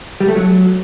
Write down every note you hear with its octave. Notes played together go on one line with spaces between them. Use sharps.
G3
A3
F#3